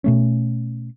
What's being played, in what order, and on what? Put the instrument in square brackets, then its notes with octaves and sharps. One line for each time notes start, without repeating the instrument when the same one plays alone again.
[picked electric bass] B2 A3 C#4